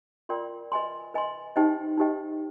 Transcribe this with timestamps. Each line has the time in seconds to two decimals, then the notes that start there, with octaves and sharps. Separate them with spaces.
0.29 F4 A#4 D5 G5 C6
0.72 B4 D#5 G#5 C6
1.14 B4 D#5 G#5 C6
1.56 D#4 G4 C5 D#5 G5
1.98 D#4 G4 C5 D#5 G5